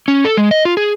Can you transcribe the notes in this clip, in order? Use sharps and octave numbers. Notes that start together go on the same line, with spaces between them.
C#4
A4
G#3
D#5
F4
G#4